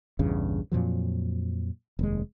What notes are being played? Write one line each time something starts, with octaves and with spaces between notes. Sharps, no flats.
A#1 E2 G2 C#3
F2 A#2 F3 F#3
F1 D#2 G#3